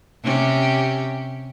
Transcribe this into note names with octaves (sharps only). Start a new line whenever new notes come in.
C3 C#4 G4